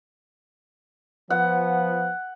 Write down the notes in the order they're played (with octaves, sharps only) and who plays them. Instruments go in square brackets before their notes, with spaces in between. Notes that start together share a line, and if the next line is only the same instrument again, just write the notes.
[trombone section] F3 [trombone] B3 [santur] F#5